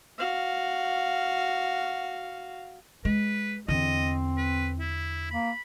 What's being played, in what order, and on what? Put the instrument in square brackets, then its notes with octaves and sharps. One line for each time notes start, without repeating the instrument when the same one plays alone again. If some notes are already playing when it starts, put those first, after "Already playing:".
[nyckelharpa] F#4 F5
[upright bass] G#3 [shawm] B4
[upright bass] E2 D3 [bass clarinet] C4 [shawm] D#5
[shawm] B4
E4
[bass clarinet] A#3 [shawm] B5